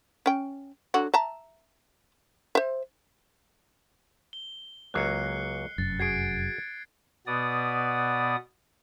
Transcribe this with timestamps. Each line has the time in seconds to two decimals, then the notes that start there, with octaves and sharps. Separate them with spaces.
0.26 C#4 G5
0.94 D3 F#3 F#4
1.14 E5 A5 A#5
2.55 C5 E5
4.33 G7
4.94 C#2 F#3 A#3 F#6 C7 C#7
5.78 F1 F#2 A6
5.99 F#4 G#4 G#6 C7 D7
7.27 B2 B3 D5 D#6